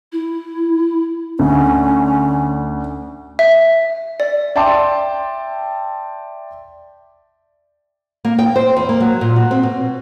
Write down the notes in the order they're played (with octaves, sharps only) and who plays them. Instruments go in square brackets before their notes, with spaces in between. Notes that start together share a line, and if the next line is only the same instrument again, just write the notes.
[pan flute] E4
[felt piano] D2 [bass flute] C#4
[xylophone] E5
D5
[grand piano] D5 E5 G5 A5 C6 D6
[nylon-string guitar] A#3
G5
C5
E2
A#3
F#3
A#2
F#4
C4
B2